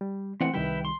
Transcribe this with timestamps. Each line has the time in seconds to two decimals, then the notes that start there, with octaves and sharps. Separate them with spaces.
0.01 G3
0.41 E3 A3 C4 F#5
0.54 C2 D#3 G3 E4 B4 G5
0.85 C6